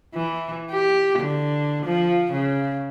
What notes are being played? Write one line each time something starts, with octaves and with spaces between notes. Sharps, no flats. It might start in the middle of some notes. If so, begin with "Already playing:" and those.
E3
G4
D3
F3
C#3